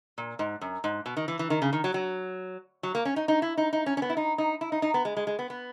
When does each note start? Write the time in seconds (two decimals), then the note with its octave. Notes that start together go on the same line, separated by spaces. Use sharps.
0.18 A#2
0.39 G#2
0.61 F#2
0.84 G#2
1.06 B2
1.17 D#3
1.28 E3
1.39 E3
1.50 D#3
1.62 C#3
1.73 D#3
1.84 F#3
1.94 F#3
2.83 F#3
2.95 A#3
3.05 C#4
3.16 D#4
3.28 D#4
3.42 E4
3.57 D#4
3.73 D#4
3.86 C#4
3.97 C#4
4.02 B3
4.10 E4
4.17 D#4
4.38 D#4
4.61 E4
4.72 D#4
4.82 D#4
4.94 B3
5.05 G#3
5.17 G#3
5.27 G#3
5.39 B3
5.50 B3